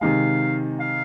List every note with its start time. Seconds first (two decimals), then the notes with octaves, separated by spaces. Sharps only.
0.01 C3 D#3 G#3 F5
0.80 F5